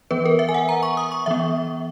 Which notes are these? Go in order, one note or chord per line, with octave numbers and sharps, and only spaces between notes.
E3 B3 B4
A#4
E5
G#5
F#5
A#5
C#6
D#6
C#6
E3 B3 E5